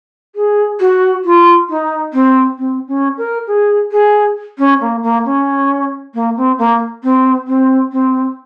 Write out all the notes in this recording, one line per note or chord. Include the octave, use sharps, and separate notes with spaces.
G#4
F#4
F4
D#4
C4
C4
C#4
A#4
G#4
G#4
C#4
A#3
A#3
C#4
A#3
C4
A#3
C4
C4
C4